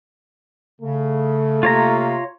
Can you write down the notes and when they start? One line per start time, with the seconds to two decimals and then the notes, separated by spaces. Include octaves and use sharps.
0.81 C#3 A3
1.63 C3 A#3 F4 C#5 A#5